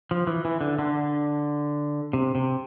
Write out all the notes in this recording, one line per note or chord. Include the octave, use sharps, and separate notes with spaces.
F3
E3
E3
D3
D3
C3
C3